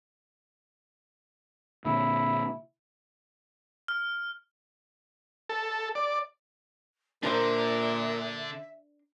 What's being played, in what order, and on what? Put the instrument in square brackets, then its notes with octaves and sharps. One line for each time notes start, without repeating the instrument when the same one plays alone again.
[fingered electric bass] A#2 D3 [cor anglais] E4
[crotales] F6
[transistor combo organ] A4
D5
[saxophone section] A#2 [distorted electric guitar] D3 [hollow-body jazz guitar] D4 A#4 C5 [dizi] E5